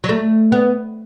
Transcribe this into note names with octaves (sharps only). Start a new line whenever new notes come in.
F#3
A3
B3